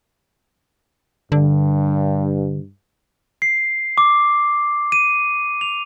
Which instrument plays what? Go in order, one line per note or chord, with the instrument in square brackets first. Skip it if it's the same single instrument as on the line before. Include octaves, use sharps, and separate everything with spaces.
[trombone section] G2 [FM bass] D3
[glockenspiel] C7
D6
D#7
F7